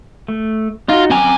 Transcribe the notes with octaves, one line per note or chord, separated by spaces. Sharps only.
A3
D#4 F4 F#4
F#2 C4 G#5 A#5 D6